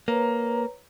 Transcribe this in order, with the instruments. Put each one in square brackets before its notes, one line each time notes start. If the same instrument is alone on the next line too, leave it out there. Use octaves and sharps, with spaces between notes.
[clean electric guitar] A#3 [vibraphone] B4 C#5 A#5